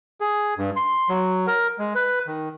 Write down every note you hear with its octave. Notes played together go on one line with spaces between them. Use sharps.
G#4
G2
C6
F#3
A#4
G#3
B4
D#3